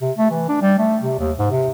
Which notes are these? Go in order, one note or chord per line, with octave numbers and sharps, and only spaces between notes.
C3
A3
E3
D4
G3
A3
C3
D#2
G#2
C3